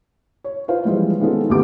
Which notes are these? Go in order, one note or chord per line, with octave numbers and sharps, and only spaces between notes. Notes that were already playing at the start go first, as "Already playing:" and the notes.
C#5
F4 B4 C5 F5
E3 F3 G3 G#3 E4 F4
D#3 G#3 B3 C#4 F4 A4
D2 B3 G4 D6